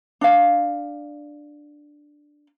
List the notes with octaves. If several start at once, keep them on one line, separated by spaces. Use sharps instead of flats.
D4 F5